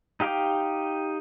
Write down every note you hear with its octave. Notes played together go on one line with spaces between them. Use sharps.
D#4 G4 F5 G5 D6